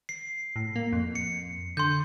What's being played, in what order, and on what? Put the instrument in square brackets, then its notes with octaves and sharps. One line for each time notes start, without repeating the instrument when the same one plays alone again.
[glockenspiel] C7
[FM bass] A2
A#3
F2
[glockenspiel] C#7
[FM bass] D3 [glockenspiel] C6 G6